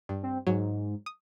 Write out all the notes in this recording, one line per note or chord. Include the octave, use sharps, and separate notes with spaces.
G2
C4
G#2 F#3
D#6